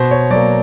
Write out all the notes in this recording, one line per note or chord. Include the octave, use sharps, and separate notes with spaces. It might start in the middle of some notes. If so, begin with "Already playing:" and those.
Already playing: B2 C5
C#5
F#3 D5
A#3